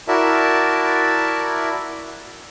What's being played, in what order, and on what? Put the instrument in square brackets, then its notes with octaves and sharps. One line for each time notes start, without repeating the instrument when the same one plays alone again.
[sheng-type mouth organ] E4 F#4 A#4 D5 E5 A5